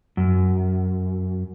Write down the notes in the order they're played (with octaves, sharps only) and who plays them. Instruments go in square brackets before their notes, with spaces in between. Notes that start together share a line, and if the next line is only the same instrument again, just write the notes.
[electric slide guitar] F#2